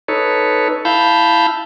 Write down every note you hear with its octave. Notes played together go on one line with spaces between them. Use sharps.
D#4 A4 B4 C#5
E4 F5 A5 B5 G6